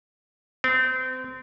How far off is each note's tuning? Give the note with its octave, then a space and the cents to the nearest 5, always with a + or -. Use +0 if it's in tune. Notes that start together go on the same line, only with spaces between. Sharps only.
C4 -30